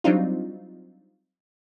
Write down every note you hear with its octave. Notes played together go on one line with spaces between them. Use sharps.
F#3 G3 C4 D4 D#4 F4